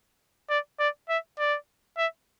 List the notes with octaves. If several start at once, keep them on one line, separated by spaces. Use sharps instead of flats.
D5
D5
E5
D5
E5